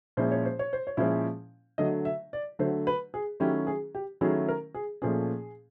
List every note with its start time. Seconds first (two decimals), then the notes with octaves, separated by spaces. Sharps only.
0.17 A#2 F3 G#3 C#4 E4 C5
0.32 C#5
0.45 C5
0.59 C#5
0.73 C5
0.87 C#5
0.97 A#2 F3 G#3 C#4 E4 C5
1.78 D3 F#3 A3 D#5
2.05 E5
2.33 D5
2.59 D3 F#3 A3 C5
2.87 B4
3.14 G#4
3.40 D#3 F#3 A3 C#4 E4 G4
3.67 G#4
3.95 G4
4.21 D#3 F#3 A3 C#4 E4 G#4
4.49 A#4
4.74 G#4
5.02 A#2 F3 A3 C#4 G#4